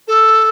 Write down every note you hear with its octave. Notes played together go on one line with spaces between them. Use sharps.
A4